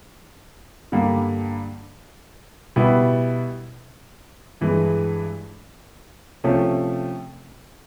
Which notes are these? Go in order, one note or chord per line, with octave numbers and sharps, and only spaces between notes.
G2 D3 G3 A#3
B2 G3 B3 E4
G2 E3 G#3
C3 F3 A3 C#4